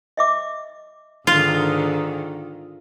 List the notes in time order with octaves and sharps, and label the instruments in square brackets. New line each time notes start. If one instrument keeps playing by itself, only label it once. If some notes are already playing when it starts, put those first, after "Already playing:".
[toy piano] D#5 E5 D6
[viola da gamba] G#2 D3 D#3 [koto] F4